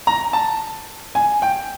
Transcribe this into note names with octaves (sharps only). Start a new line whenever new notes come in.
A#5
A5
G#5
G5